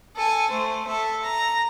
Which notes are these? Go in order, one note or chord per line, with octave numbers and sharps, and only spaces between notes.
A4 G#5
A3 C5
A4 E5
A#5